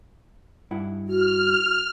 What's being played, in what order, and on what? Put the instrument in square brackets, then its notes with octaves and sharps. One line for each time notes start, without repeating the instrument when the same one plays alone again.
[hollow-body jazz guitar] G2 E4 F#5
[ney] F#4 [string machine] F6